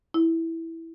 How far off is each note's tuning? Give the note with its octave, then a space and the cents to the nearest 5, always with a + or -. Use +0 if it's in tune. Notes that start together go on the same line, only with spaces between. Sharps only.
E4 -5